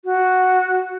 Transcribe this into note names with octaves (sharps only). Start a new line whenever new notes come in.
F#4